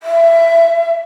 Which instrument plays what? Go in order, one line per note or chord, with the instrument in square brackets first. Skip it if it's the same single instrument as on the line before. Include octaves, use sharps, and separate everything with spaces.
[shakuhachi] E5